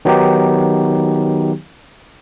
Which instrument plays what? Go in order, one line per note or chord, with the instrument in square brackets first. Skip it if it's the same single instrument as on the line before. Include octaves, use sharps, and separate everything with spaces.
[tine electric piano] D#3 F#3 B3 D#4 G4